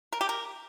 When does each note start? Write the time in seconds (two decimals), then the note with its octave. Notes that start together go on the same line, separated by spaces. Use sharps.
0.13 A#4
0.21 G4
0.29 A#4